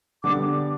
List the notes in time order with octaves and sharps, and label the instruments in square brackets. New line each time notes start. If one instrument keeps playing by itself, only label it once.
[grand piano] D3 G3 B3 D4 [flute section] D6